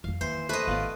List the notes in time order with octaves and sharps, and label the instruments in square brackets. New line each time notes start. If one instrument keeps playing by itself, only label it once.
[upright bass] F2 F#3 [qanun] F5
[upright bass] D#2 [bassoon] E3 [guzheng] C5
[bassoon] C3 [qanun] A3 C5 [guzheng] B4 D#5
[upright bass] G#1 A2 [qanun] B3 D5 [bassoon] F4